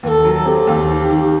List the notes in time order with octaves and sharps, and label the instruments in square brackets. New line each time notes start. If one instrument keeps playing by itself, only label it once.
[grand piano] D#2 [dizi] B4
[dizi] A4
[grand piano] F#3
[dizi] A4
[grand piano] C4 [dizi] G4
[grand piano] D#2
D#3
D#3